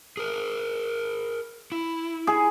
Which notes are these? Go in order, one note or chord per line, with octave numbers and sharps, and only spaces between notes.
G#4 A#4
E4
G#4